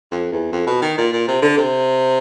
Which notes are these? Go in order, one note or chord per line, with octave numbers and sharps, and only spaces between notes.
F2
E2
F2
B2
D#3
A#2
A#2
C3
D3
C3